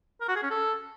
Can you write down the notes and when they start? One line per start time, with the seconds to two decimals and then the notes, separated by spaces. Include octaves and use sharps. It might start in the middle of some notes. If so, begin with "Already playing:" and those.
0.21 A#4
0.28 F#4
0.36 G#4
0.43 C#4
0.50 A4